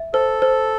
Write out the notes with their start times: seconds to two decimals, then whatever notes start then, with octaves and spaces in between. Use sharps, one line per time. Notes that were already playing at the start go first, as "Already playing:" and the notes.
Already playing: E5
0.14 A4 C5
0.42 C5